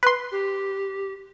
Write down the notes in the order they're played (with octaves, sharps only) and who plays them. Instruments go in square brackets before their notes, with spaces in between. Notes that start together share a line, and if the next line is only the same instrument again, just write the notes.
[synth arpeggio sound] B4 C6
[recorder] G4